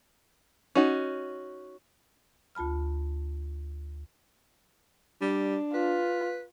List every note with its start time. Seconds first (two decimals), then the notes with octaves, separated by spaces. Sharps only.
0.75 C#4 D#4 F#4
2.55 D2 F4 A5 B5 F6
5.21 G3 D4
5.74 F4 B4